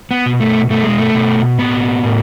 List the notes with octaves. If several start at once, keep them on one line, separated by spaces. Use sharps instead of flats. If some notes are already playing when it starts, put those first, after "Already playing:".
B3
B2
A3
B2 A3
G#3
A3
B2
A2 B3
A2